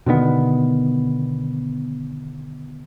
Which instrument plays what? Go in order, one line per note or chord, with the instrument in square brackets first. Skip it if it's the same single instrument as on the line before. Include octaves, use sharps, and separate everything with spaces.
[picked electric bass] B2 D3 D#3 B3